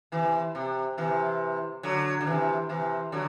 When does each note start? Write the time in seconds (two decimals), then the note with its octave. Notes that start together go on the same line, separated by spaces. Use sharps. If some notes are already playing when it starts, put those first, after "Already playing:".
0.12 C3 E3
0.55 C3
0.98 C3 E3
1.83 D3 F#3
2.21 D3
2.26 C3 E3
2.69 C3 E3
3.12 D3 F#3